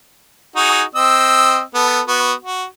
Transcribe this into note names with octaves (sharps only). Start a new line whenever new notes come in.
D#4 F#4 G#4
C4 D#5 E6
B3 A4
B3 F#4
F#4